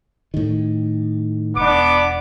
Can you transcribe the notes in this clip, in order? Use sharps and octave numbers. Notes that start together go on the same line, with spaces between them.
A2 D#3
E1 B3 D4 D6